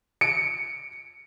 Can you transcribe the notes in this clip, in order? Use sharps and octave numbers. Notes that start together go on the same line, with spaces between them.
C#7 D7